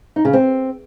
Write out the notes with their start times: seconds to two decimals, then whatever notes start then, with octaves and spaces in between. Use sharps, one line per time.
0.16 D#4
0.25 C#3
0.33 C4